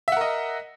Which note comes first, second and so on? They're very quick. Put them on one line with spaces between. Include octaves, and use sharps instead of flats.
E5 F#5 A#4 D#5